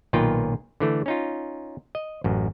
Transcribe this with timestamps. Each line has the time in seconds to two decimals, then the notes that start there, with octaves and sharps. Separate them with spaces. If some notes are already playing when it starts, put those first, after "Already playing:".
0.13 B1 A#2 D#3 F4 B4 G5
0.80 D3 E3 A3
1.06 C#4 D#4 F4
1.95 D#5
2.24 A1 F#2